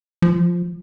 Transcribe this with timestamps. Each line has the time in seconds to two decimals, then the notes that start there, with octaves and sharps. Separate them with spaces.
0.22 F3